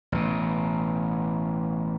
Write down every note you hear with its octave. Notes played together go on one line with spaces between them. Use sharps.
A1 B2